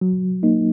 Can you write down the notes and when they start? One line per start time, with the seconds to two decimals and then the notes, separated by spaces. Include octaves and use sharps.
0.01 F#3
0.43 A#3 D#4